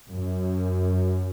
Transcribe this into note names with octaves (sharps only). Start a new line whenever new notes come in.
F#2